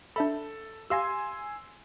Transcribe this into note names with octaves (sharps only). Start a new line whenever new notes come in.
D4 A4 E5 B5
G4 F5 G#5 C6 E6 A#6